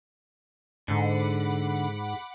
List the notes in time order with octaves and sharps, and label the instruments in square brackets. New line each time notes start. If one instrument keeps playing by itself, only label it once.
[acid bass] G#2 [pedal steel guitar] D3 [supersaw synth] F#5 B5 D6